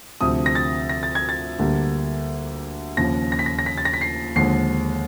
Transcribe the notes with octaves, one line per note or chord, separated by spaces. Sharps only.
D2 C3 F3 D#6
A#6
A6
A#6
A6
G#6
A6
D2 D3 G3 A#3
D#2 C#3 F3 A#6
A#6
B6
A#6
A#6
B6
A6
A#6
B6
C7
D#2 D3 F3 G#3 C7